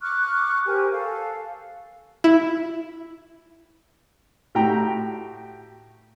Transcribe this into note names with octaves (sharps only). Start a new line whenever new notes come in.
C#6 D6 F6 F#6
G4 A#4 C5 G#5
A4 F5
E4
A2 F#4 G4 G5 A#5